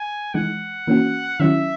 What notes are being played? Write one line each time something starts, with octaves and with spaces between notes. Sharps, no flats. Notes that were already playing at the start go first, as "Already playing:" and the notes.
Already playing: G#5
E3 G#3 D#4 F#5
E3 A#3 C#4 F#4
D#3 F#3 C#4 E4 E5